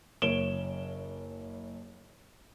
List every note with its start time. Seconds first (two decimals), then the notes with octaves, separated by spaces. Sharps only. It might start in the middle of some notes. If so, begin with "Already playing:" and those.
0.22 F#1 C#5 D7 E7 G7